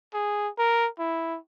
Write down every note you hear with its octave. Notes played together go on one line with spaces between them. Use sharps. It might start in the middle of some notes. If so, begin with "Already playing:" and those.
G#4
A#4
E4